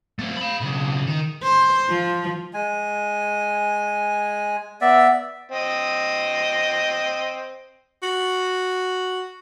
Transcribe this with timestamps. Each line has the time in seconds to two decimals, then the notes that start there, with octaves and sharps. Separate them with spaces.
0.19 A3 C4
0.37 F5 B5
0.61 B1 C#3
1.07 D#3
1.43 C5
1.90 F3
2.54 G#3 G#5
4.81 B3 D5 E5
5.52 C4 D#5
8.03 F#4